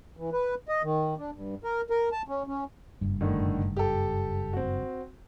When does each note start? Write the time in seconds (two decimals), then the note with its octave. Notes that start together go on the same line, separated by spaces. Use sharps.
0.17 E3
0.32 B4
0.68 D#5
0.83 D#3
1.18 D4
1.32 G2
1.64 A#4
1.90 A#4
2.12 A5
2.28 C#4
2.47 C#4
3.01 F#1 G2
3.21 A2 D3 D#3
3.77 G4 A4
4.53 C4 F#4